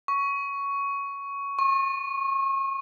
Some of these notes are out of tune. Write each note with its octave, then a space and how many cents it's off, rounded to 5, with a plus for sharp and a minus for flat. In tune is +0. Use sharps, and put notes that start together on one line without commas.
C#6 +10
C#6 -35